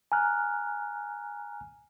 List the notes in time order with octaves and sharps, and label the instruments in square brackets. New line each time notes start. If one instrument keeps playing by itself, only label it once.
[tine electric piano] G#5 A#5 F6 F#6